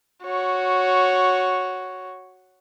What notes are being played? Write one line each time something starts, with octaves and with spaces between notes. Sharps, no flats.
F#4 C#5